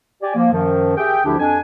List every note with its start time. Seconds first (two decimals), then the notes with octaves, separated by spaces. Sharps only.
0.22 G4 D5 G#5
0.35 F3 A#3
0.52 F#2 D#3 F3
0.97 G4 G#4 E5 G5
1.25 D2 D3 F3 D4 E4 G4
1.39 F2 D4 G#5